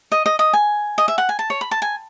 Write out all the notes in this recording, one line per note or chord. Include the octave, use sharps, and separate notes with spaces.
D#5
D#5
D#5
G#5
D#5
E5
F#5
G#5
A5
C#5
B5
A5
G#5